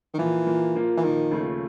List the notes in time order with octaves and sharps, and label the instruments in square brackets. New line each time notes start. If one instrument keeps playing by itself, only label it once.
[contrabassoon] D#3
[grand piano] A#2 F3 A#3 [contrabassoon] E3
[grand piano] A#2 F3 A#3
A#2 F3 A#3
[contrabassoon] E3
[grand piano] A#2 F3 A#3 [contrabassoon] D#3
[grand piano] D#2 C#3 F3 A3